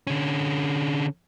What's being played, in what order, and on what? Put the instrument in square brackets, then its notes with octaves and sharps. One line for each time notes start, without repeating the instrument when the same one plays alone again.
[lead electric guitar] D3 C#4